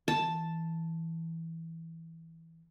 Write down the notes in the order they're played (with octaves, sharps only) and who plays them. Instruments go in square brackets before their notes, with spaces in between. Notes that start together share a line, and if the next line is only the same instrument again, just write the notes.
[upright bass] E3 [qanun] A5